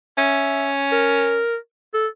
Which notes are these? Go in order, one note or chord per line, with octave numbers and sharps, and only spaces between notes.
C#4 E5
A#4
A4